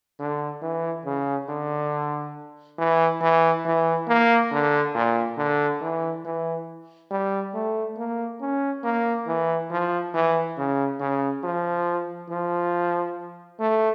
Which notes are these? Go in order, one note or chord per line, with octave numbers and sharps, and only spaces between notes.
D3
E3
C#3
D3
E3
E3
E3
A#3
D3
A#2
D3
E3
E3
G3
A3
A#3
C#4
A#3
E3
F3
E3
C#3
C#3
F3
F3
A3